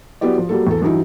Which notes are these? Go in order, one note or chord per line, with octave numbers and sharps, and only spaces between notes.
F#3 B3 E4 G4 D5
F3
F#3 G3 A#3 A4
E2 A4
G2 E3 F#3 D#4 E4